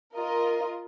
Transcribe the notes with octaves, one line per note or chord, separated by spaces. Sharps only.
F4 A#4 D#5